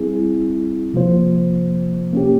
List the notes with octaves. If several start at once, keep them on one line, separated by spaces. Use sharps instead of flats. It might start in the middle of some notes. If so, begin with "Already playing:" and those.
Already playing: G3 C4 E4 G#4
C3 F3 A#3 F4 C5
A#3 C#4 G4